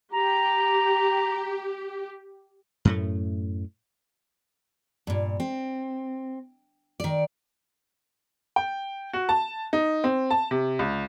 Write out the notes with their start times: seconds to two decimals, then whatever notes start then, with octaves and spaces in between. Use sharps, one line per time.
0.13 G4 A#5
2.85 F#2 A2 A3
5.07 G2 A#2
5.40 C4
7.00 D#3 D5
8.56 G5
9.13 F#4
9.29 A5
9.73 D#4
10.04 C4
10.31 A5
10.51 C3
10.79 C#2